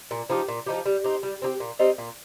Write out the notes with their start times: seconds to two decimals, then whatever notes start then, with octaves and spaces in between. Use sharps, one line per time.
0.11 A#2
0.30 F3 D#4 G4
0.48 A#2
0.67 F3 D#4 G4
0.86 G3
1.04 C4 D#4 G4
1.23 G3
1.42 C4 D#4 G4
1.60 A#2
1.79 G3 C4 D#4
1.98 A#2